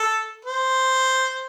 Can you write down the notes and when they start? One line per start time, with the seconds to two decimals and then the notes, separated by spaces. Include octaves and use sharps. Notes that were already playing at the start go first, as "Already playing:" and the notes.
Already playing: A4
0.45 C5